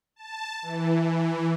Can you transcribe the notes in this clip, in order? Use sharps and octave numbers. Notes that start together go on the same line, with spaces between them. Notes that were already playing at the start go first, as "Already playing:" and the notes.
A5
E3